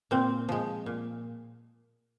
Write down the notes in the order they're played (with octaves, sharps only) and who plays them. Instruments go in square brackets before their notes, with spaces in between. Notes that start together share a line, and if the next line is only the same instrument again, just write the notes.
[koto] A#2 C4
F3 G#3
A#2